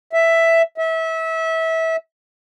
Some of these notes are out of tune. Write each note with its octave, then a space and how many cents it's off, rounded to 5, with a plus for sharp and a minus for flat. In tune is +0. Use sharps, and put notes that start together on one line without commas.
E5 +5
E5 -25